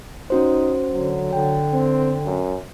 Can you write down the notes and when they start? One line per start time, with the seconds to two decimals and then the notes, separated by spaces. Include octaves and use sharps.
0.30 C#4 D#4 F#4 C5
0.94 D3 F#3
1.33 D3 G5
1.73 C4
2.26 F#2